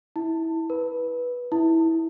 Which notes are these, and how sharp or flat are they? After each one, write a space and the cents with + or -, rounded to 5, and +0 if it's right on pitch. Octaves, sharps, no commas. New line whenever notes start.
E4 -20
B4 -10
E4 -15